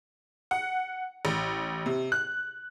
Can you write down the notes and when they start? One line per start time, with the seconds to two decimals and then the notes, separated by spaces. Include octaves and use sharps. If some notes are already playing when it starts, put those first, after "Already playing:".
0.51 F#5
1.25 A1
1.86 C3
2.12 F#6